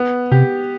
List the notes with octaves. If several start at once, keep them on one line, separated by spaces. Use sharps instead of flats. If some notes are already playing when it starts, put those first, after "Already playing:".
Already playing: B3
C3 G4